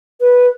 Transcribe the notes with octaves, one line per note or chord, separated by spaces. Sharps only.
B4